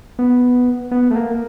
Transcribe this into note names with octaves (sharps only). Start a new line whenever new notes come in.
B3
B3
A3
A#3